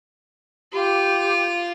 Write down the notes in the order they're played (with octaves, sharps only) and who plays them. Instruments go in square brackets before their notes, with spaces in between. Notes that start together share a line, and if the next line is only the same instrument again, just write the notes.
[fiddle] F4 [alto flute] G4